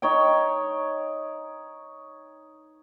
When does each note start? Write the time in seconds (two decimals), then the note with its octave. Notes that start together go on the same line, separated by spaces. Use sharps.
0.02 D#4 C#5 G5